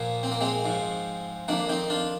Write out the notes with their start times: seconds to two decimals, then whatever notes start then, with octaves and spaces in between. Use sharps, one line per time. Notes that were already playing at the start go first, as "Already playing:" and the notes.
Already playing: A#2 F3 A#3
0.23 C4
0.32 A#3
0.41 G#3 C4
0.64 G#2 F3
1.48 F2 D#3 A#3 D4
1.69 C4 D#4
1.90 D4 F4